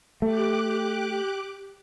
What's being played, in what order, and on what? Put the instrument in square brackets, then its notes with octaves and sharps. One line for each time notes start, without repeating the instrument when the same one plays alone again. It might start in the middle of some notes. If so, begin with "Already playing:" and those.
[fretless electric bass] A3 [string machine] G4 D6 F#6